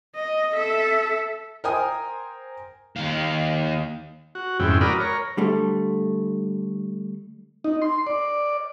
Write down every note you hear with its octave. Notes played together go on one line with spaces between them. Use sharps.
D#5
A4 E5
A#4 C5 G5 G#5 A#5 D#6
D#2 F5
F#4
F2 G#2 C#3 E4 G5
F#4 A#4 D5 B5 D#6 F6
A#4 C#5
D3 G3 A3
D#4
C6
D5